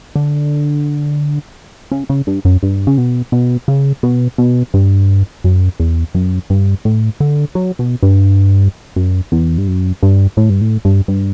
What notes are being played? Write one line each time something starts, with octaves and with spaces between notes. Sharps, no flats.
D3
C#3
C#3
G2
F#2
G2
C#3
B2
B2
C#3
B2
B2
G2
F#2
E2
F#2
G2
A2
D3
F#3
B2
G2
F#2
E2
G2
F#2
G2
A2
G2
A2
G2
G2